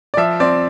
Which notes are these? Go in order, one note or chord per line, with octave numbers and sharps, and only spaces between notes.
D5
F3 E5
C4 D5